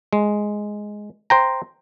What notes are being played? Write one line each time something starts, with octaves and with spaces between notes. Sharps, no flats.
G#3
C5 G5 A#5